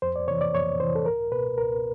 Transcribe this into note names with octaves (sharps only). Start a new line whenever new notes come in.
F2 C5
D5
C3 E3 C#5
D5
F2 C#5
C3 E3 C5
A4
C#2 A#4
B2 B4
C#2 A#4